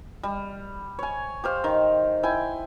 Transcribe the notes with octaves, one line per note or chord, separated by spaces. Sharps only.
G3
C#5 G#5
G4 C5 F5
D#3
E4 G5 G#5